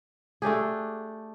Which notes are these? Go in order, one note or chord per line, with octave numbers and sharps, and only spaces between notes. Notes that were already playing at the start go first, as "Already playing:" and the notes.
A3 D4 G4 G#4